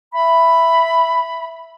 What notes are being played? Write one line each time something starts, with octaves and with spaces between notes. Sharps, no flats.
E5 B5